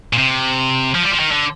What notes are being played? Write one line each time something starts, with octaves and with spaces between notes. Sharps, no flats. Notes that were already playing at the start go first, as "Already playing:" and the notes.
A#2
C3
F3
G3
F3
D#3
D3